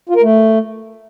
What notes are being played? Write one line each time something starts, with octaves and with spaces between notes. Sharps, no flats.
F4
A#4
A3